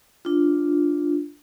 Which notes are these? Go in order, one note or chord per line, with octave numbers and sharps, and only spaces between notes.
D4 F4